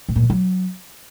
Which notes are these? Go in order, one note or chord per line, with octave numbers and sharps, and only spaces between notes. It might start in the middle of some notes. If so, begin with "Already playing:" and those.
A2
A#2
D#3
F#3